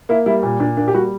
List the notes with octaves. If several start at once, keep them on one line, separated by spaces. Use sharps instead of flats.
A#3 E4
G3 E4
A#2
A#2 D4
A#3 D4
G4
G3 F#4